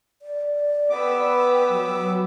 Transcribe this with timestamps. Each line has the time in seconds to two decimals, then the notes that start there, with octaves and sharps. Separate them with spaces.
0.22 D5
0.90 B3 G4 B4 D6 E6
1.70 F#3